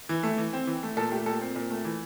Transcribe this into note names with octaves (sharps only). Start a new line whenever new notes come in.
E3
A3
E3
C4
E3
A3
A#2 A4
A3 G4
A#2 A4
C4
A#2
A3
E3